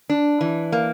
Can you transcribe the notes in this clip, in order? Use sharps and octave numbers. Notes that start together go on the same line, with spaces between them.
D4
E3
A#3